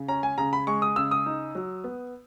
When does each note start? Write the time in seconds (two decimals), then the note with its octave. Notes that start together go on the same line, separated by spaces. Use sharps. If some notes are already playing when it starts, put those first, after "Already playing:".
Already playing: C#3
0.08 C#4 A#5
0.23 G#5
0.38 C#3 A#5
0.53 B5
0.67 G#3 C#6
0.82 D#6
0.96 C#3 E6
1.11 D#6
1.26 D#4
1.55 F#3
1.84 B3